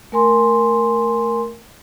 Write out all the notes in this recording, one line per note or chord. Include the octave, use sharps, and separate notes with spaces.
A3 A#4 G#5 C6